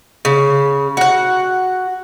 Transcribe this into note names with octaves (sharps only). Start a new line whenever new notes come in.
C#3
F#4 F#5